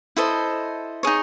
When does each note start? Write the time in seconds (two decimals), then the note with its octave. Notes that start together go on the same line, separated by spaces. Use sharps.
0.17 E4 A4 C5 D#5
1.03 D#4 G#4 C#5